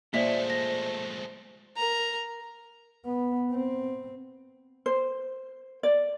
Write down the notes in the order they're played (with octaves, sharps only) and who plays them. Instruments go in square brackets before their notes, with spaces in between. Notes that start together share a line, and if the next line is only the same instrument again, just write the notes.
[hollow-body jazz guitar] A#2 [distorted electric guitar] G#3 A3 [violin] C5 [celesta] D5 E5 B6
[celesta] A#6
[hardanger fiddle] A#4 A#5
[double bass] B3
C4
[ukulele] C5
D5